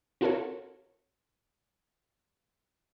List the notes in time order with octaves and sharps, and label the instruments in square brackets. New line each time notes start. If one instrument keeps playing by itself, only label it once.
[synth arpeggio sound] C4 F4 F#4 A4 A#4 C#5